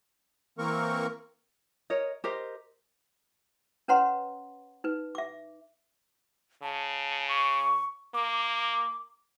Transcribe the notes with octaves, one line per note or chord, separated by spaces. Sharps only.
E3 A#3 C4 A#4 C#6
A#4 C#5 D#5
G4 A#4 C5 D#5
C#4 B4 C#5 F#5 A#5 C6
D#4 B4
E5 D6
C#3 A5
C#6
A#3 D6